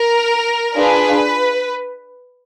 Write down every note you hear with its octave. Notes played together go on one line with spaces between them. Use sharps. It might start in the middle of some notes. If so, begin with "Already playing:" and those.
Already playing: A#4
D4 F4 G#4 B4